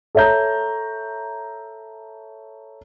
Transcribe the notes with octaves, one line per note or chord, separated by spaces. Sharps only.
A4 C#5 E5 A#5 G6